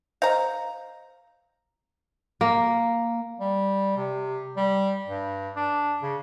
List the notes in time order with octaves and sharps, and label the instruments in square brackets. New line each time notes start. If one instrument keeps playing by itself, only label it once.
[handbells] C5 D#5 [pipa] F5 A#5
[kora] A#3
[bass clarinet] G3
C3
G3
G2
D4
C#3